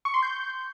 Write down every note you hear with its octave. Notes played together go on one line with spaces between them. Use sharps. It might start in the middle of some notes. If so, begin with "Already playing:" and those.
C#6
C6
G6